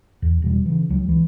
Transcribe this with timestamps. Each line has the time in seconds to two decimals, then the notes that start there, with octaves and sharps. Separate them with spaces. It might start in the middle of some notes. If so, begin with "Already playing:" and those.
0.22 E2
0.42 E1 B2 G3
0.66 C#3 E3
0.89 C#2 F#3
1.09 C#2 E3